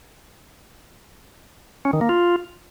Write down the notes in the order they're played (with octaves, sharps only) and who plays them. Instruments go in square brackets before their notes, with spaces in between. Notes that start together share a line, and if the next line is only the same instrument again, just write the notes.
[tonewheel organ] C#4
D#3
A#3
F4